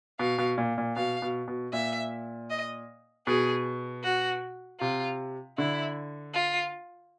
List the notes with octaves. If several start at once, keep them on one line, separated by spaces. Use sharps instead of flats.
B2 F5
B2
A#2
A#2
B2 F5
B2
B2
A#2 E5
D#5
B2 G#4
F#4
C3 F4
D3 E4
F4